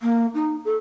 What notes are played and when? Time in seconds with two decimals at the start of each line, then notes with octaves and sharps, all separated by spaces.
0.01 A#3
0.34 D#4
0.65 A4